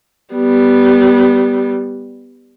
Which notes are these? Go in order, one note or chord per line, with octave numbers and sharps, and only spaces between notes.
G3 B3